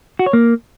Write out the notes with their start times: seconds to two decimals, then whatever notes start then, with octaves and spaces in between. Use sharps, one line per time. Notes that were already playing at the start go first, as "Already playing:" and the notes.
0.19 F#4
0.26 C#5
0.33 A#3